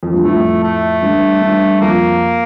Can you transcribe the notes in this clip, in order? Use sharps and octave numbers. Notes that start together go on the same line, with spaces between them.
F2
G2
F2 A2 A3
A3
G2
G2
F2 A#3